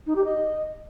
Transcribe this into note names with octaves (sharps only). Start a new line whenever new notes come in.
D#4
G4
D#5